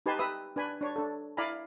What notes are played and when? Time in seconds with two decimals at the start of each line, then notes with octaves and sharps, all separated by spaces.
0.06 D#4 G4 B4 G#5 A5 C6
0.19 G4 B4 E5 D#6
0.56 D4 B4 G#5 B5
0.81 D4 C#5
0.96 D4 A4
1.37 E4 D5 F5 G#5 A#5 B5